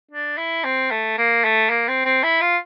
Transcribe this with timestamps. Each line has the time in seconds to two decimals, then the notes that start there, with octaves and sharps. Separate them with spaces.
0.11 D4
0.38 E4
0.64 C4
0.91 A3
1.18 A#3
1.44 A3
1.70 A#3
1.88 C4
2.05 C4
2.23 E4
2.41 F4